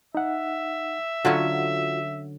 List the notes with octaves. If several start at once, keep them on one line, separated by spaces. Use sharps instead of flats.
D#4 E5 F#5
D3 F#3 C#4 F4 F#4